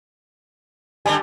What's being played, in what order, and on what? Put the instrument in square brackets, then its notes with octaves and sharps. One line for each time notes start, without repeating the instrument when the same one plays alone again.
[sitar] D3 G3 [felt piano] G#5 A5